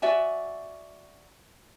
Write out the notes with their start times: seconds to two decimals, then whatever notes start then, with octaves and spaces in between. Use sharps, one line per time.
0.02 F#4 D5 E5 G#5